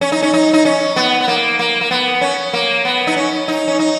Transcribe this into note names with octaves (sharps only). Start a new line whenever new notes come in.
C#4
D#4
C#4
D#4
D#4
C#4
B3
B3
A#3
A#3
A#3
B3
C#4
A#3
B3
D#4
C#4
D#4
C#4
D#4